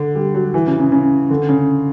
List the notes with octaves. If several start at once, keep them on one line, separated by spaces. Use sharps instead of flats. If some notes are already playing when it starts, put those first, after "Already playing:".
Already playing: D3
G3
F#3
E3
C#3
C#3
C#3
D3
C#3